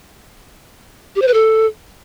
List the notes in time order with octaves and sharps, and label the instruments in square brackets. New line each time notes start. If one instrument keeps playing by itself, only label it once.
[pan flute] G4
C5
B4
A4